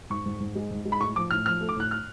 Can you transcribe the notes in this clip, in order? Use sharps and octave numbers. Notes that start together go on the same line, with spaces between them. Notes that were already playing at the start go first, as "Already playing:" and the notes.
G#2 C#6
G#2
G#2
G#3
G#2
G#3
B5
A2 C#6
F3 D6
A2 F6
F3 F6
A3
D6
A2 F#6
F6